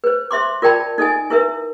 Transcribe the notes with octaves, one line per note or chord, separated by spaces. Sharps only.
B4 C5
C5 E5 C6 D6
F4 A#4 D5 G5 A5 B5
D#4 A4 D#5 G#5
E4 A#4 B4 E5